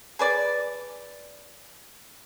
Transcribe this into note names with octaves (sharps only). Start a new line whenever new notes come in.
G#4 B4 D5